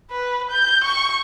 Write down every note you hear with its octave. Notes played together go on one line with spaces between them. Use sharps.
B4
G6
C#6